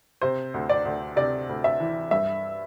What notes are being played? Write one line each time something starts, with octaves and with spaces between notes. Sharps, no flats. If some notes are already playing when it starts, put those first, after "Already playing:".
C3 C5
D2
D5
D2
C3 D5
D2
E5
E3
G2 E5